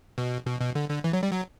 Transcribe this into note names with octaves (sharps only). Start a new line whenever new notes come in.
B2
B2
B2
D3
D3
E3
F#3
G3
F#3